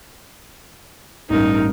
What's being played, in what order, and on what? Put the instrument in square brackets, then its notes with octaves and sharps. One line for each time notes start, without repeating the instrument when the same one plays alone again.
[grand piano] A1 G2 [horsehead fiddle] D#4 A#4